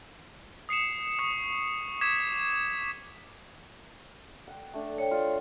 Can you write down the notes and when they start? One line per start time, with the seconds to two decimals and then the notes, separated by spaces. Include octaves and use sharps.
0.69 D#6 C7 C#7 E7
1.19 C#6 D#6 E7
2.01 D6 G#6 B6 E7
4.47 F#5 G5
4.74 A3 D4
4.98 C#5 G5
5.11 F4 D5 D#5